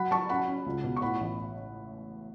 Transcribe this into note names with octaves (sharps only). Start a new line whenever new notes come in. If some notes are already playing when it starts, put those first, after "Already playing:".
Already playing: F#3 F#5 B5
F#3 A5 C#6
C#4 F#5 B5
C#4
C#2
B2
C#6
A2 F#5 B5
A1